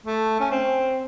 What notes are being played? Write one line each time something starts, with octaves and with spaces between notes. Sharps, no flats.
A3
C#4
C4